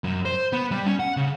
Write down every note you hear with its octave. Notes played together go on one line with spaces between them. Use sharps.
F#2
C5
B3
G3
C#4
F#5
C#3